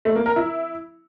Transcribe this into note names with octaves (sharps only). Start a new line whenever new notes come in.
A3
A#3
A#4
E4